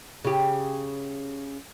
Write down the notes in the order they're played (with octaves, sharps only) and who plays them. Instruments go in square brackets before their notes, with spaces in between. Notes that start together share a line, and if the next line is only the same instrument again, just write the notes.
[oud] C#3 G4